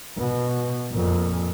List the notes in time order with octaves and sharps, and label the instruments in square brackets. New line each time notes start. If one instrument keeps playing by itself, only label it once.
[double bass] B2
F2 A#2